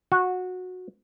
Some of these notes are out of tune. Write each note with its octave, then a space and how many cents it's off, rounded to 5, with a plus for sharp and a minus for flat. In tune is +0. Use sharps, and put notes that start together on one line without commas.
F#4 -15